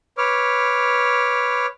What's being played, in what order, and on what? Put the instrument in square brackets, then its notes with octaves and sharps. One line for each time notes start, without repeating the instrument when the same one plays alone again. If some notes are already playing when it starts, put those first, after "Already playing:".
[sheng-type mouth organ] B4 C#5 D6 F6